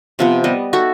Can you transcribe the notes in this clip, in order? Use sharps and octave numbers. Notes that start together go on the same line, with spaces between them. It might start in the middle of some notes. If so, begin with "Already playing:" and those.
C3 F3 B3
G3 B3 D#5
D#4 F#4 A4 E5